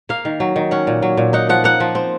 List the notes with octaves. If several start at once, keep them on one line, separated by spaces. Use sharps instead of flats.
A#3 F5
D#3
F#3
D#3
C#4 F#5
A#2
F#3
A#2
D#4 F#5
F3 F#5
A#3 F#5
F3
C4